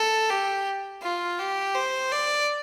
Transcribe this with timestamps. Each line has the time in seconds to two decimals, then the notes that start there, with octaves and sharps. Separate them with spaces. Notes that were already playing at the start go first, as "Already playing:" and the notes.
Already playing: A4
0.30 G4
1.02 F4
1.39 G4
1.75 C5
2.12 D5